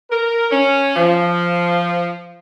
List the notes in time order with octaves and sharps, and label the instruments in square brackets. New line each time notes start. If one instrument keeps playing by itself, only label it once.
[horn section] A#4
C#4
F3